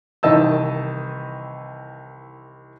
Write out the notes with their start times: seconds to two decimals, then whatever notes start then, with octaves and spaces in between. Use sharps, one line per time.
0.23 C2 D#3 E3 D#5 A5 E6